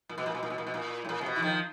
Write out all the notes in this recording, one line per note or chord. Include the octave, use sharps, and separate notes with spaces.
A#2
B2
A#2
B2
A#2
B2
A#2
B2
A#2
A2
A#2
C3
B2
E3
D#3 F3